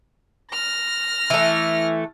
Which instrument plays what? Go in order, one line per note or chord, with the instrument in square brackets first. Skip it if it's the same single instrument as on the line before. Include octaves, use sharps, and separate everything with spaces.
[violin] F6 A#6
[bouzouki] E3 A3